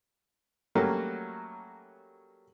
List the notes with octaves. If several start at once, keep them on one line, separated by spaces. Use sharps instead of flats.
F#3 G3 A3 A#3 C#4 F#4